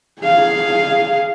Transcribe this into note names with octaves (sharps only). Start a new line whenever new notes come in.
G#4 F5